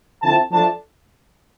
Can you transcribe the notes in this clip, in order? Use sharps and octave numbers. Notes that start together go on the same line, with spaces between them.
D3 F3 C4 E4 A5
F3 A3 D4 A5